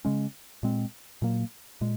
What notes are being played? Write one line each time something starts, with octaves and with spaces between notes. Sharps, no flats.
C#3 G#3 C#4
A#2 G#3 C4
A#2 F#3 A#3
A#2 G#3